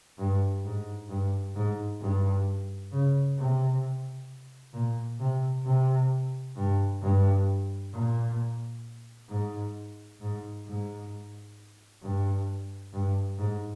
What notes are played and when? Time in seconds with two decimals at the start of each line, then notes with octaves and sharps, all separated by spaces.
0.18 G2
0.64 G#2
1.09 G2
1.55 G#2
2.00 G2
2.92 C#3
3.37 C3
4.73 A#2
5.19 C3
5.65 C3
6.56 G2
7.01 G2
7.93 A#2
9.29 G#2
10.20 G#2
10.65 G#2
12.02 G2
12.93 G2
13.38 G#2